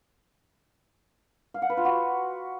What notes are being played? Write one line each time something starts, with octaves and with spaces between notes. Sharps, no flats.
F5
F#5
B4
F4
F#4